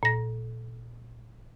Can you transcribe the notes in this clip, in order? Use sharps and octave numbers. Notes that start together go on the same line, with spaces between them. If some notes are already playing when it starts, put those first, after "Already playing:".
A#2 A#6